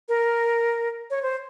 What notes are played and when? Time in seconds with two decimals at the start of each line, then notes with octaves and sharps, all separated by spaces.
0.09 A#4
1.10 C#5
1.23 C5